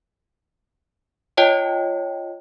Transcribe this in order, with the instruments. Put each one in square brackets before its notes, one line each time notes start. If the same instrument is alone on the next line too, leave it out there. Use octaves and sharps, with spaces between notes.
[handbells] F4 C#5 D#5 G5 A5